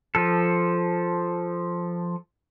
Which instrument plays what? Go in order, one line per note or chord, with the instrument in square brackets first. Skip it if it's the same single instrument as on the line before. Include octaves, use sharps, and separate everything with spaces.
[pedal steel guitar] F3 A4